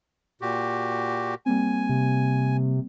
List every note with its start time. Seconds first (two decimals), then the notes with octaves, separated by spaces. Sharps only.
0.41 A#2 F#4 G4
1.46 G3 A#3 C4 G#5
1.89 C3